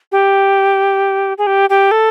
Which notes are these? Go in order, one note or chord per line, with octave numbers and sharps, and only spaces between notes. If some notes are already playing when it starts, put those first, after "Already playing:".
G4
G#4
G4
G4
A4